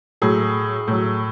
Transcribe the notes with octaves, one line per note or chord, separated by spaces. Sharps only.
A2 F#3 G#4
A2 F#3